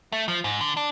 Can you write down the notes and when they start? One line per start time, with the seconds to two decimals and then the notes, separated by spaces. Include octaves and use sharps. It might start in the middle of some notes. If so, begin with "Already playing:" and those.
0.12 A3
0.28 F3
0.44 G#2
0.61 D3
0.77 D4